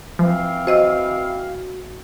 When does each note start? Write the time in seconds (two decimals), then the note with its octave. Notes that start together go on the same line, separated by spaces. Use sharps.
0.19 E3 F3 C4 F5
0.67 F#4 C5 D#5 E6